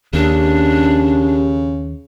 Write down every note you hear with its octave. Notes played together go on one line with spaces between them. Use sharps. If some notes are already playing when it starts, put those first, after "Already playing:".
D#2 C#3 C#4 D4 G4 A#4